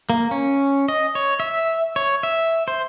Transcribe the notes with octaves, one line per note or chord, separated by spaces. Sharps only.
A#3
C#4
D#5
C#5
E5
C#5
E5
C5